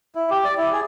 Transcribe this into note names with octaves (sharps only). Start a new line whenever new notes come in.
E4
G4
D5
E4
G#4